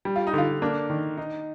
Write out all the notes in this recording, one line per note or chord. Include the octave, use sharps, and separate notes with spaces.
G3
F4
D#4
D3 F4
A#3 D4
D#3
D#4